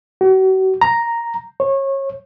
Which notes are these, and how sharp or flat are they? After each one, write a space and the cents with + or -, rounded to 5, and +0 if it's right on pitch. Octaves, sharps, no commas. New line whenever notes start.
F#4 +40
A#5 +0
C#5 -25